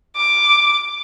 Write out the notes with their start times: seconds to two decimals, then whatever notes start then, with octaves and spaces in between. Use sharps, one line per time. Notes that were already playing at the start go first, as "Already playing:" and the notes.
0.16 D6